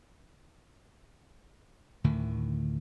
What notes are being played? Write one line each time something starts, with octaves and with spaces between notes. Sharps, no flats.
D2 A2 D3 D#3